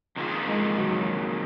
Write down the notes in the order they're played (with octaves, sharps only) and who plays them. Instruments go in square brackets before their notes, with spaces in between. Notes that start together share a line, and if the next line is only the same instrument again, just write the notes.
[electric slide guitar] F2 D#3 A#3 F4 G#4
[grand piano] G#3
F#3